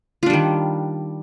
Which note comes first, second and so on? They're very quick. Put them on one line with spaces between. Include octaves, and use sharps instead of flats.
F4 D4 G3 D#3